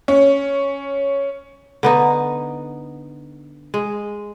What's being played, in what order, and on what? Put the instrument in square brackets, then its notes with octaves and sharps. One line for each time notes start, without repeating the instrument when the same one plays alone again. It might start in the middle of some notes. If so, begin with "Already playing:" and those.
[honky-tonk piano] C#4
[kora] D3 B3 D#4
G#3